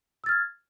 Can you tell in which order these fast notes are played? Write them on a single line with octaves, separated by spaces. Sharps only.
E6 A6 F6 G#6